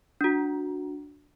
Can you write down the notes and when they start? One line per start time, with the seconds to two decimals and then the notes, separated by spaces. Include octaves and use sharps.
0.21 D4 F#4